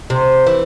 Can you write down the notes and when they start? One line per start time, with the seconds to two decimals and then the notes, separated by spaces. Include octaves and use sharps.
0.10 C3
0.47 E3